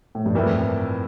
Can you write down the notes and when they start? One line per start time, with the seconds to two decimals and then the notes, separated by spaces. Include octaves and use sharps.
0.15 A2
0.26 G2
0.35 F2 A2 E3 A#3 E4